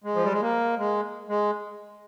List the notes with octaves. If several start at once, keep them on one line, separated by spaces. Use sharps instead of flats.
G#3
F3
G3
G#3
A#3
G#3
G#3